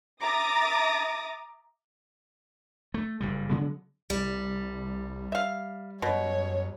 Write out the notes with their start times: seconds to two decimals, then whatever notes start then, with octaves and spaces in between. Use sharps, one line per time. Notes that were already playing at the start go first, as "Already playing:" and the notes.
0.22 E5 A#5 D6 D#6 A6 A#6
2.94 A3
3.21 F#1 A#2 G3
3.50 C#3 F#3 G#3 B3
4.10 C2 G3
5.32 E5 F5
6.02 F#2 B2 C#5